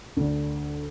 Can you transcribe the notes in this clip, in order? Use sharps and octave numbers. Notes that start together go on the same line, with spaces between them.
D2 D3